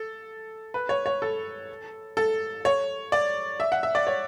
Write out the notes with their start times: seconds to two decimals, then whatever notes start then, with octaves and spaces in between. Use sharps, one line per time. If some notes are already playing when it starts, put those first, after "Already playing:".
Already playing: A4
0.74 B4
0.89 C#5
1.06 C#5
1.22 A4
2.17 A4
2.65 C#5
3.12 D5
3.60 E5
3.72 F#5
3.83 E5
3.95 D5
4.07 C#5